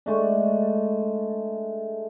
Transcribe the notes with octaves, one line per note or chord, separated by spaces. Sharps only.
G#3 A3 D4